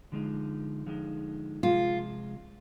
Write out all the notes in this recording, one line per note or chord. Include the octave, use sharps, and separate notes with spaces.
D3 F3 G#3 D#4
D3 F3 G#3 D#4
C3 F3 G#3 F4